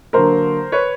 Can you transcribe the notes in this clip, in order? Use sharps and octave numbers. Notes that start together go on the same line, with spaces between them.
D3 F#3 A#3 A#4 C5
B4 C#5